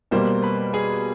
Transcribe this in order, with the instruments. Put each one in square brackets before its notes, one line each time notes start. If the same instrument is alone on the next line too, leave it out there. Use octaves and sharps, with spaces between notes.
[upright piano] B2 G3 A#3 [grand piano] C5 C6
[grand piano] B4 B5
G#4 G#5